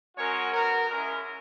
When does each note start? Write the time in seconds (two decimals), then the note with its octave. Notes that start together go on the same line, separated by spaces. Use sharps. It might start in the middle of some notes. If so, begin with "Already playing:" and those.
0.17 G#3 C#4 F#4 A#4 C#5
0.52 B3 F#4 A#4
0.89 G#3 C#4 E4 A#4